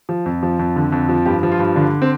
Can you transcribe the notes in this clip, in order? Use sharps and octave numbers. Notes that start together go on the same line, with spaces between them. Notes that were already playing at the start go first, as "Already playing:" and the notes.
F3
F2
F3
F2
D3
F2
F3
G2 G4
F3
F4
G2
D3 D4
C4